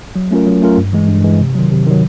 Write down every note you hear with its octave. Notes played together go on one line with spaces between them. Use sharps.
F#3
A3 C#4 F4 A#4
F#3
A3 C#4 F4 A#4
G2
E3 G#3
G2
E3 G#3
C3
D#3 F#3
C3
D#3 F#3